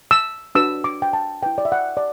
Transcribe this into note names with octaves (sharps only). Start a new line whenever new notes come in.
E6
D4 F#4 B4 E6
D6
G5
A5
E4 B4 G5
D5
E5
F#5
D5